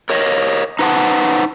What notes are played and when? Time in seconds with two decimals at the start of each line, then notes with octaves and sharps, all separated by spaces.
0.10 A#4 C#5 D#5
0.79 D#4 B4 C5 F#5 A5